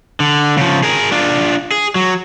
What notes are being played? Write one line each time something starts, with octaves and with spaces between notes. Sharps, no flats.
D3
C#3 F3
G#4 A#4
D4 F4
G#4
F#3